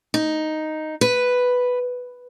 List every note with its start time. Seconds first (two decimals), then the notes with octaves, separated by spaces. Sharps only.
0.14 D#4
1.01 B4